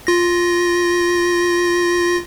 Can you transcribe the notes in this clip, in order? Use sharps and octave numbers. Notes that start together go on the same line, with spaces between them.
F4 A#6